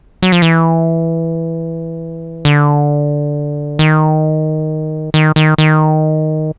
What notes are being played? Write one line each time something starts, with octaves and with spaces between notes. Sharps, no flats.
F#3
F3
E3
D3
D#3
D#3
D#3
D#3